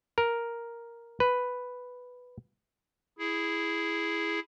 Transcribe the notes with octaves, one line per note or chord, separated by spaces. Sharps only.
A#4
B4
E4 G#4